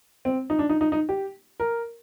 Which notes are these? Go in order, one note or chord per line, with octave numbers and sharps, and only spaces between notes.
C4
D#4
D4
D#4
D#4
D#4
G4
A#4